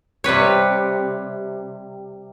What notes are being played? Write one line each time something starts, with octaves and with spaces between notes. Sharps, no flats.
C3 G3 B4 C#5